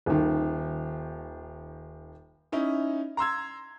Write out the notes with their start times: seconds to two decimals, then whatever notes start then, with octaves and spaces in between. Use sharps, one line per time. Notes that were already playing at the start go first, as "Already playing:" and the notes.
0.06 D#1 D#3
2.52 C#4 D#4 E4
3.17 A#5 C6 E6 G#6